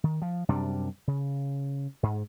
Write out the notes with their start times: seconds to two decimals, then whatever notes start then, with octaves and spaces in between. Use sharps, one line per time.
0.04 D#3
0.22 F3
0.49 F#2 C3 G3 D4
1.07 C#3
2.03 G#2